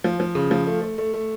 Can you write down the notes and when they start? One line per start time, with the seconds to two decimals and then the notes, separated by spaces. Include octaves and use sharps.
0.04 F3
0.20 F3
0.35 C#3
0.51 F3
0.67 A3
0.82 A3
0.98 A3
1.14 A3